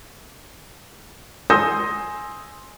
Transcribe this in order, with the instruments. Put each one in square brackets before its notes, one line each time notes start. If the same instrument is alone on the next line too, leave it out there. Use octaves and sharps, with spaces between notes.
[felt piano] G#5 C6 D#6 E6 G6 A#6